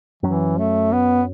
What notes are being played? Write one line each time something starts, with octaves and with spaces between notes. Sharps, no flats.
F#2 E3 F#3 C#4
A3
B3